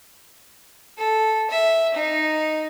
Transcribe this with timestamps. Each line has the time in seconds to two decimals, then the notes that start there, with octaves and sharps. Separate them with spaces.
0.98 A4
1.50 E5
1.94 D#4